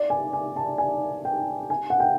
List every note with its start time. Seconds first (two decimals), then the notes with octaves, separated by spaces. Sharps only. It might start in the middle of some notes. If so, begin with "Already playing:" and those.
Already playing: D5
0.10 G#5
0.33 G#5
0.56 A5
0.78 G#5
1.25 G5
1.70 G#5
1.90 F#5
2.00 G5